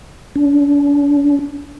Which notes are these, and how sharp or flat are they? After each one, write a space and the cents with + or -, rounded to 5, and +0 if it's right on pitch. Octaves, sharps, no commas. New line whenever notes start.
D4 -45